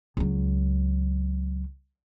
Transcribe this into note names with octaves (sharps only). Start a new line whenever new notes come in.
C#2 F#3